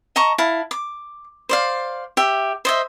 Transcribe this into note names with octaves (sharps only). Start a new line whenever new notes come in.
D#5 A5 A#5 C#6
E4 F5 A5
D6
C5 D5 F5
G4 E5
C5 D#5 E5